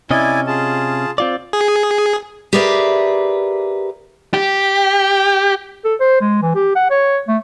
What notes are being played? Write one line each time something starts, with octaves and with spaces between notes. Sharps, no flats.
C3 C#4 E4 D5 D#5 G#5
F4 G#4 A5
C4 F4 D5
G#4
G4 G#4 A#4 B4 D5 E5
G4
A4
C5
G#3
E3
G4
F#5
C#5
A3